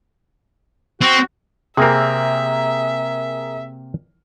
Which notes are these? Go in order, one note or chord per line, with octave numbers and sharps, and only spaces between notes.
C4 F#4
C3 A#3 C4 G#4 A#4 E5